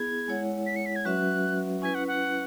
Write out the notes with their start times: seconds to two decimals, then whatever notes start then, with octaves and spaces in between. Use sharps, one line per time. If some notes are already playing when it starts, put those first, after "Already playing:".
Already playing: B3 E4 G#4 G#6
0.28 G#3 E4 C#5 F#5
0.66 B6
0.76 C#7
0.86 B6
0.96 G#6
1.05 F#3 C#4 F#4 B4 E5 F#6
1.82 C#4 E4 B4 G#5
1.95 F#5
2.08 F#5